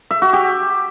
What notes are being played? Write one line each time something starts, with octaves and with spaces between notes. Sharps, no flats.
E5
F#4
G4